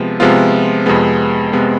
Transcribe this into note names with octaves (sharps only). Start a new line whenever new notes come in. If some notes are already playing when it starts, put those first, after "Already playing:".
Already playing: C3 F3 G#3 B3
C3 F3 G#3 B3 F4
F2 C3 G#3 B3
C3 G#3 B3